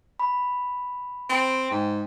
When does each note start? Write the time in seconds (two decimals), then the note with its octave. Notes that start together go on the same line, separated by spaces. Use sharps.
0.20 B5
1.29 C4 G5
1.71 G#2